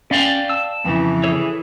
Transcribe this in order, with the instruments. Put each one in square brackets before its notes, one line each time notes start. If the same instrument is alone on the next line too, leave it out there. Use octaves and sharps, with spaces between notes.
[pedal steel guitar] C#4 [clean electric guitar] D5 F5 G5
[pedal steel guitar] A5 E6
[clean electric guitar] F2 C#3 [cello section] E3
[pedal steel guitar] G#4 A4 C#5